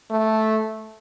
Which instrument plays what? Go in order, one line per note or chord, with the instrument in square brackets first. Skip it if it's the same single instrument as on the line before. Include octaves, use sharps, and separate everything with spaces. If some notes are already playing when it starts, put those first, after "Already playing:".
[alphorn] A3